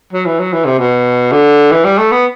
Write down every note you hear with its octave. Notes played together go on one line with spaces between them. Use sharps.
F#3
E3
F#3
E3
C3
B2
D3
E3
G3
A3
B3